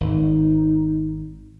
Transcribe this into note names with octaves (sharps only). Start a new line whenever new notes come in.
G#1 D#4